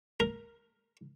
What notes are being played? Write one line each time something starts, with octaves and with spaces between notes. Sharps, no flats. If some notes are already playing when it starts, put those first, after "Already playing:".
A#4